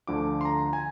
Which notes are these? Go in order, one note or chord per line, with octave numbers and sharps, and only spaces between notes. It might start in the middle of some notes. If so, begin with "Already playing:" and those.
D2 D3 F3 D6
C6
A#5
G#5